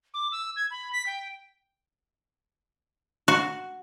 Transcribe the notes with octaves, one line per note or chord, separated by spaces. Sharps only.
D6
E6
G#6
B5
B6
G5
F#4